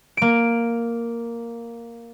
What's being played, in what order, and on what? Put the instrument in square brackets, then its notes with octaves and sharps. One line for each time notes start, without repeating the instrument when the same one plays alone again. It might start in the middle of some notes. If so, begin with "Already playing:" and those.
[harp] A#3 D7